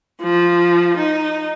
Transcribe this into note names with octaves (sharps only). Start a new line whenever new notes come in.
F3
D#4